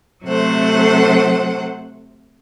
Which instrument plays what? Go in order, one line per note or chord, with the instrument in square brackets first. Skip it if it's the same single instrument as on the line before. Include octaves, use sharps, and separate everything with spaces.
[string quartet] C3 F#3 A3 C5 F#5